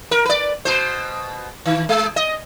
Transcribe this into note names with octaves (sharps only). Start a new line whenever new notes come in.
A#4
B4 D5
B2 C5
D#3
G#3
D#5